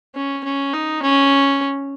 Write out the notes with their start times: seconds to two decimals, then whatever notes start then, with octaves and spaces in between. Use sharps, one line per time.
0.15 C#4
0.44 C#4
0.74 D#4
1.03 C#4